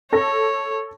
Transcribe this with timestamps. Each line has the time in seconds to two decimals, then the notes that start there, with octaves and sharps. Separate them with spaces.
0.13 A4 C#5 A#6